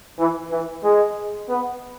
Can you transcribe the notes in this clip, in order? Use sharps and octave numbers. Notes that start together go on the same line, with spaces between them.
E3
E3
G#3
B3